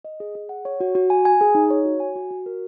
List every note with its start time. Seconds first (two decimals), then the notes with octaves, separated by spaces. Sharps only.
0.05 D#5
0.20 G#4
0.35 G#4
0.49 F#5
0.65 C#5
0.80 F#4
0.95 F#4
1.10 G#5
1.25 G#5
1.41 G#4
1.55 D#4
1.70 C#5
1.85 F#4
2.00 G#5
2.16 F#4
2.31 F#4
2.46 A#4